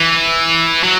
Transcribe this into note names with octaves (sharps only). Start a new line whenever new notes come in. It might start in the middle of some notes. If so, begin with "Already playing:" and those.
Already playing: E3
F#3